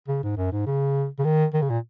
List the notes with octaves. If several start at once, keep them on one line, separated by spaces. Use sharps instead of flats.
C#3
G#2
F#2
G#2
C#3
C#3
D#3
D#3
C#3
A#2